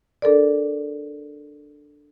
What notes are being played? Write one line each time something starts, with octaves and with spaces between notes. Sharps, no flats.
D4 A4 A#4 D5